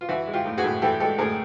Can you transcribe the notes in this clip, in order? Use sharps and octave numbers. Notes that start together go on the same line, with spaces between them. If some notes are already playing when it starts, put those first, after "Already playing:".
F4
E3 E4 F#4
G#3
F4 G4
A2
F#4 G#4
A2
E3 G4 A4
G#3 G4 A4
A2 G#4 A#4